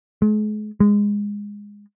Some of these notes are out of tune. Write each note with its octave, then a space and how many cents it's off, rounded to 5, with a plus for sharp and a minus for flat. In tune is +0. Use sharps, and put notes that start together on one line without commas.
G#3 +40
G#3 -15